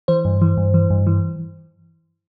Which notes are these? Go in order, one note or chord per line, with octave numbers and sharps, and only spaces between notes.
E3 C5
G2
E3
G2
E3
G2
E3